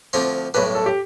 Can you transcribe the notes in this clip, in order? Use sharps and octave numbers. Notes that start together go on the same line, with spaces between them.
D2 D3 F3 C4 F4
B1 A2 G3 D4 B4
A4
G4